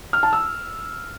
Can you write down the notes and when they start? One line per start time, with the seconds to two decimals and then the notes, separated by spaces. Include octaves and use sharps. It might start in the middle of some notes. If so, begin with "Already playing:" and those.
0.13 F6
0.23 A5
0.33 E6